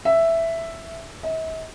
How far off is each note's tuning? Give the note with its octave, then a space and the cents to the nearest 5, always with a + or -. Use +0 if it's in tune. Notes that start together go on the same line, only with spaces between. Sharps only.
E5 +5
E5 -45